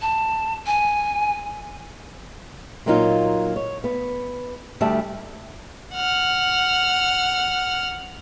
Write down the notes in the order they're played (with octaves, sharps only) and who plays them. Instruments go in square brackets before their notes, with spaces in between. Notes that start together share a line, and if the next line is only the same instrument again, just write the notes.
[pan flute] A5
G#5
[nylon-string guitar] A#2 F#3 A#3 D#4 F4
C#5
B3
D2 G3 A3 D5 E5 A5
[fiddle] F#5 F6